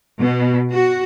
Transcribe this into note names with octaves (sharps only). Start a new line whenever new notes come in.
B2
F#4